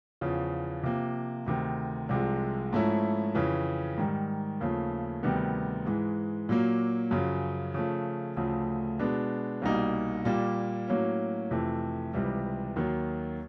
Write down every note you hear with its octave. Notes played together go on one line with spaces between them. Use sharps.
E2 C#3 F3
C3 F3 A#3
D2 C3 D#3
C2 C3 F3 G#3
G#2 F3 A3 C#4 E4
F2 C#3 E3
G#2 D#3 G3
D#2 C#3 F3 A3
D2 C3 D#3 G3 B3
G#2 E3 G#3
A#2 F#3 A#3
F#2 C#3 F3
C#3 F3 A3
D2 C#3 F3 A3
B2 G#3 B3 D4
C2 B2 G3 A#3 D#4
A#2 G3 A#3
A2 F#3 A#3 C#4
F2 C3 E3 A3
C#2 C3 E3 G3
D#2 D#3 F#3